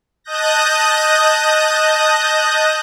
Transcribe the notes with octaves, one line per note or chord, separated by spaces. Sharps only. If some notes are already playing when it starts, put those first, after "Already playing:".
D#5 A5 D#6 F#6 G6 A#6